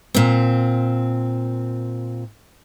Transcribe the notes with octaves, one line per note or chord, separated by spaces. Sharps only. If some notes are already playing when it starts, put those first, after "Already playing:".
A#2 C4